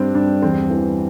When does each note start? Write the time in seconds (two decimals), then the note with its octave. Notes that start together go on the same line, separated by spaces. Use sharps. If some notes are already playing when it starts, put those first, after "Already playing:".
Already playing: G2 G3 C4 D4
0.15 G2 D4
0.42 E2 C4
0.70 E3